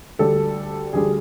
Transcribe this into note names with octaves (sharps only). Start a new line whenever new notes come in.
D2 D3 G3 A4
D2 D3 G3 G#4